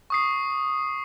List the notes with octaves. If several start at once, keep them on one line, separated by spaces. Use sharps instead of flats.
C#6 D#6 C7